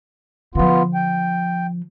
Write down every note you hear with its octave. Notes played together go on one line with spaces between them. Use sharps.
D3 F3 B3 F4
G5